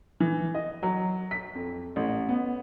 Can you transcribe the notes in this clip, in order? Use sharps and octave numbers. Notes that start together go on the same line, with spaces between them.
E3
D#5
F#3
B6
F2
A1
B3